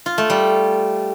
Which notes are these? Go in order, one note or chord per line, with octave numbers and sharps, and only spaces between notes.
F4
A3
G3